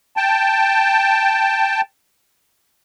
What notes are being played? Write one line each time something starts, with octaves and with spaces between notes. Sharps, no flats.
G5 A5